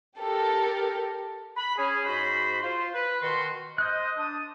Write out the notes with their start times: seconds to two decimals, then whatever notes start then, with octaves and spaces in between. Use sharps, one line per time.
0.17 G4 A4 A#4
1.57 B5
1.77 C#4 G#4
2.04 G#2 F#4 C5 B5
2.60 F4 C5
2.92 B4
3.22 B2 D#3 F#4 C6
3.78 C5 D#5 F#6 G6
4.17 D4 A5 D#6